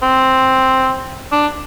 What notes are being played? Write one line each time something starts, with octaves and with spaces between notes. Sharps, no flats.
C4
D4